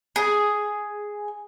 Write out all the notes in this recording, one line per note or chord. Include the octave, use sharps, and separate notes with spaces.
G#4